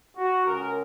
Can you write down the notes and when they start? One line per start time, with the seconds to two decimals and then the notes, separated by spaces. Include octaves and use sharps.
0.16 F#4
0.46 C#2 C#3 G#3 C#4 A#4